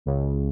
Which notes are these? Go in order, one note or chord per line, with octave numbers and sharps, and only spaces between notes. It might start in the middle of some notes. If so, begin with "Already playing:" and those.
C#2